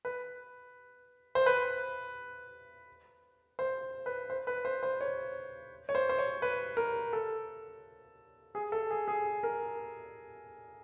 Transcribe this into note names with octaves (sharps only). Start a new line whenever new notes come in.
B4
C5
B4
C5
B4
C5
B4
C5
C5
C#5
C#5
C5
C5
C#5
B4
A#4
A4
G#4
A4
G#4
G#4
A#4